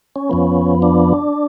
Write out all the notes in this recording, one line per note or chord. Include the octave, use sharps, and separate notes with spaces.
C#4
F2 F3 B3
D4